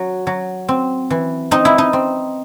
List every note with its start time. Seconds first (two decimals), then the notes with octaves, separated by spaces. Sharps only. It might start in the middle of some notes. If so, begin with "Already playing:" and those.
Already playing: F#3
0.27 F#3
0.69 C4
1.10 E3
1.51 C4 D#4
1.65 E4
1.78 D#4
1.93 C4